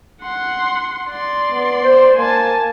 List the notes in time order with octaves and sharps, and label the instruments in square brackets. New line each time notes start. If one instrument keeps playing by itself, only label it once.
[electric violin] F#5 C6
D5 C6
[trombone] B3
C5
[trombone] A#3 [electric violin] G#5 A5